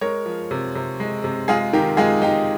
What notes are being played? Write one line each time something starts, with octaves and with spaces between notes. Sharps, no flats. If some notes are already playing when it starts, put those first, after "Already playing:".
G#3 A#4 C#5
F3
C3
C3
G#3
C3
G#3 F4 G#4
D#3 G4 A#4
G#3 F4 G#4
G#3 D#4 G4